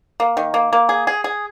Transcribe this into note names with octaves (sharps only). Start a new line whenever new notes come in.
A#3
D#3
A#3
A#3
G#4
G#4
G#4